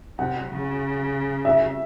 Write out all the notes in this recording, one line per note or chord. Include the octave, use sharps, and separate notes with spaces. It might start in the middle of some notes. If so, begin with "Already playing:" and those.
C3 F#5
C#3
E5